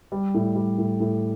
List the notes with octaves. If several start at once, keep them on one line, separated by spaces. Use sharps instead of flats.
G3
A2
G3
A2
A2